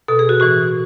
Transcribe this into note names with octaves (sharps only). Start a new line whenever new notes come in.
B2 A4
G#4
F#4
A2 E3 F#4